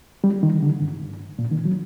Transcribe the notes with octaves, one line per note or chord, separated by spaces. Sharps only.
G3
D#3
D3
G2
G2
A#2
D#3
F#3